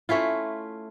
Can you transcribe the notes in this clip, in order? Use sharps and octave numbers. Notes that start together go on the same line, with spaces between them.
A3 C#4 E4 F4